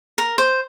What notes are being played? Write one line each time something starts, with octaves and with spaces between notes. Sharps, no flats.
A#4
C5